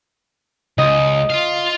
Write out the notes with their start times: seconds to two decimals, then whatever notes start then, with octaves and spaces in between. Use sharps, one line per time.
0.78 C#2 D#5
1.30 F4 F5